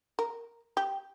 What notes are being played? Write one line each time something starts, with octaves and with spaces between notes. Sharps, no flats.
A#4
G4